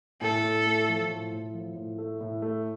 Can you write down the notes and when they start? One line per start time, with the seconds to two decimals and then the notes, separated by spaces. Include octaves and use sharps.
0.21 A2 A4
0.44 A2
0.66 A3
0.88 F3
1.10 A2
1.32 A2
1.54 F3
1.76 A2
1.98 A3
2.21 A2
2.42 A3